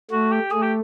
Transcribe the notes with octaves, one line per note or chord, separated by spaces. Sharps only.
A3 F#4
G4
A3 G#4
G4